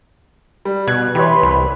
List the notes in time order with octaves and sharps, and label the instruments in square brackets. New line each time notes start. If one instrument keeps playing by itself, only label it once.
[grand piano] G3
[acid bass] B2 [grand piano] F#6 G#6
[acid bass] E3 [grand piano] G4 C#5 [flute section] B4 B5 C6
[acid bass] C2